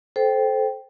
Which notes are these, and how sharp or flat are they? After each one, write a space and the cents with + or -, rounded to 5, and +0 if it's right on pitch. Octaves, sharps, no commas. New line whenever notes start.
A4 -20 C5 +0 G5 +0